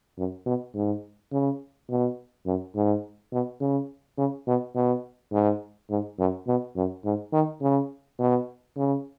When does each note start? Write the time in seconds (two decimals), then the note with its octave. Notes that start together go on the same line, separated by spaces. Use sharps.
0.17 F#2
0.46 B2
0.74 G#2
1.32 C#3
1.89 B2
2.46 F#2
2.75 G#2
3.32 B2
3.60 C#3
4.17 C#3
4.47 B2
4.75 B2
5.32 G#2
5.90 G#2
6.19 F#2
6.47 B2
6.76 F#2
7.04 G#2
7.33 D#3
7.61 C#3
8.19 B2
8.77 C#3